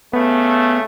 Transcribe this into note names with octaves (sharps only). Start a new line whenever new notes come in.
C#3 A3 B3